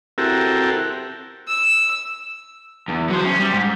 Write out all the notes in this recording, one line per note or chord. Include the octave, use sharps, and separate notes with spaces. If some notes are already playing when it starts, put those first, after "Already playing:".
C4 E4 F#4 G4 A4 A#4
E6
E2
F#3 C5
C#4
G3
G#2